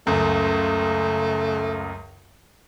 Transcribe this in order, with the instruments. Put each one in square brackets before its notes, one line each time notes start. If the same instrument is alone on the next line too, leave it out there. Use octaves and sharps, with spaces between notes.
[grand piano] C#2 F#2 [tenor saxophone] A3